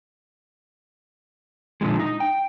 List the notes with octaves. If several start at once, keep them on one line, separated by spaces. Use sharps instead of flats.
A#2 D3 F3 G#3
D#4
G5